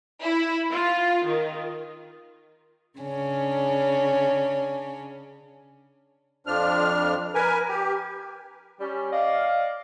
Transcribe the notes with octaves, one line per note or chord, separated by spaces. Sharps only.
E4
F4
D#3
C#3 C#4 D4
F2 F3 D4 F6
A#4 B4 G#5
G4
G3 C#4
D5 D#5 F5